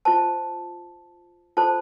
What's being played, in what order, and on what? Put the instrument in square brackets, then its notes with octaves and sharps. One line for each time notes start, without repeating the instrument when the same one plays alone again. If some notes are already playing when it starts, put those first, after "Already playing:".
[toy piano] F4 C5 A5
F4 A4 C5 A5